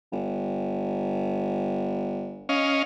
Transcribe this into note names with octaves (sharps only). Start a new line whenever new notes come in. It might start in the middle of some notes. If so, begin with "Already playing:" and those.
G1
C#4 D#5 F5